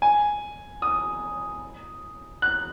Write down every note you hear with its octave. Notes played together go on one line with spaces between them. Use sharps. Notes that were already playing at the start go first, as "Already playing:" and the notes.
G#5
D#6
F#6